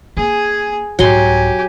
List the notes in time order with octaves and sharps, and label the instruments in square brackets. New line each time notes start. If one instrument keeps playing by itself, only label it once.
[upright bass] A#3 [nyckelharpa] G#4 G#5
[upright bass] C2 G#2 [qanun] F#3 C6 [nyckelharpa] G4 G#5